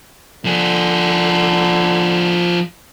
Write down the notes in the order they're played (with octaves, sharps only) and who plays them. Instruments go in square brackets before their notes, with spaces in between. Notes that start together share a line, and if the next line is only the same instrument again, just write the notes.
[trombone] D3 [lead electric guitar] F3 G#4